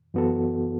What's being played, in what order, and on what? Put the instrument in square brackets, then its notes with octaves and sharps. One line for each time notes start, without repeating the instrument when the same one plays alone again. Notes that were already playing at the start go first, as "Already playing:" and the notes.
[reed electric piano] F#2 E3 B3 F#4 A4